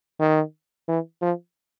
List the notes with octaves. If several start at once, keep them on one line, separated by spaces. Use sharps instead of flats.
D#3
E3
F3